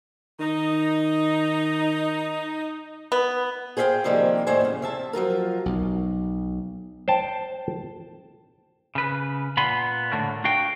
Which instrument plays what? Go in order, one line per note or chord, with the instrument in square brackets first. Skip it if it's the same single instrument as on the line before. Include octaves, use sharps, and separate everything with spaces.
[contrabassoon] D#3 [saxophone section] D#4
[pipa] B3
[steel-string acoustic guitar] G#4 C5 C#5 E5 F5 G5
C3 D#3 F3 G3 G#3 A#3
D#2 A2 G3 E4 C5 G#5
E2 C#3
C3 E5 A5
F3 F#3 F4 A#4
[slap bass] B1
[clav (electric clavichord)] C5 G5 A5
[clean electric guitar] C#3 B4
A#2 B3 F5 G#5 B5 C6
A2 D3 A3 A#3
D4 F#4 F5 G5